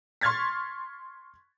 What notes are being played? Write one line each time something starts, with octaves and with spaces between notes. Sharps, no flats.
C6 C#6 F6 G#6 A6 B6